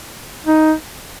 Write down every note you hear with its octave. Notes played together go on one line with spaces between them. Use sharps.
D#4